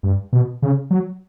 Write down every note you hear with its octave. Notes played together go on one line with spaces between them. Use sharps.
G2
B2
C#3
F#3